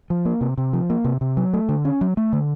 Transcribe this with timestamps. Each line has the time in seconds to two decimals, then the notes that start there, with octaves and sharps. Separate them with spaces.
0.10 F3
0.25 A#3
0.41 C3
0.58 C3
0.73 F3
0.90 A#3
1.05 C3
1.21 C3
1.37 F#3
1.53 A3
1.69 D3
1.85 C#4
2.01 F#3
2.17 A3
2.33 D3